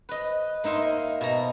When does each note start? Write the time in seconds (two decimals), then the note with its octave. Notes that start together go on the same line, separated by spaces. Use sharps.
0.09 B4 D#5
0.64 A#3 D#4 E5 F5 C6
1.21 B2 A#5